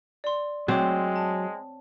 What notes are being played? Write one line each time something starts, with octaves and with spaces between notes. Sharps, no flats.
D5 C6
F#3 G#3 C4 C#5 D6
A5